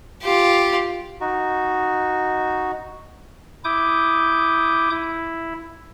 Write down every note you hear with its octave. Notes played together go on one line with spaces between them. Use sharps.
F4 G4
D#4 F#4
E4 D6 D#6 G6
E4